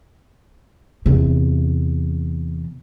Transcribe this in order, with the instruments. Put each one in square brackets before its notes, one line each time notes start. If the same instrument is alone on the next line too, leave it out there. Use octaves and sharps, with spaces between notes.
[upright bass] E2 C3